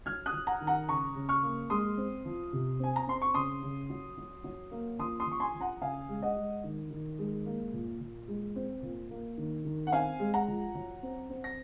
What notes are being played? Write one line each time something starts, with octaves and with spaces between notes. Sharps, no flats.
F#3 F6 G#6
D#6 F#6
F#3
F#5 A#5
D#3
F#5 A#5
C#3 A#5 C#6
C#3
C#6 F6
A#3
G#3 C6 D#6
C4
F3
C3
C4 G#5
A#5
C4 C6
C#6
C#3 C6 D#6
C#3
F#3
F#3
F#3
A#3
F3 C6 D#6
C6 D#6
F3
C#6
G#5 C6
F3
F#5 A#5
C#3 F5 G#5
G#3
D#5 F#5
G#3
D#3
D#3
G#3
A#3
A#2
A#2
G#3
C4
A#2
A#3
D#3
D#3
F#5
C4 F5 G#5
G#3
F#5 A#5
F3
F#3
C4
C4
A#6